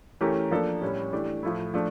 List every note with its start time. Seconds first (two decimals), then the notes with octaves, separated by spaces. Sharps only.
0.21 E3 A3 C#4 G4 A#4
0.51 F3 A#3 D4 A4
0.81 A2 G3 C#4 E4
1.13 E3 A3 D4 G4
1.43 A2 F3 A3 E4
1.74 F3 A3 D4